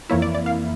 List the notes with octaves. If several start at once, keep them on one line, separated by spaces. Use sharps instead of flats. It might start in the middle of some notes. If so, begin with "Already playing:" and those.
F2 E3 A#3 E4 C#5
D5
D5
F5